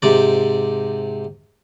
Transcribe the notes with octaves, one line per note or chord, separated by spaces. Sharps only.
G#2 C3 D5